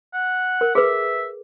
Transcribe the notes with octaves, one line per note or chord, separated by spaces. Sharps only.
F#5
A#4
G#4 B4 E5